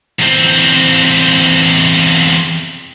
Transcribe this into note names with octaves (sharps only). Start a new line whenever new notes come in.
E2 C4